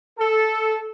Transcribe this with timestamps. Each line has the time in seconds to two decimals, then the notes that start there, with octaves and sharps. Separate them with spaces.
0.18 A4